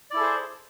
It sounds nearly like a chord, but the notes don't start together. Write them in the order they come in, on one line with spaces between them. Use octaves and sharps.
D5 E4 A4 G#4 C5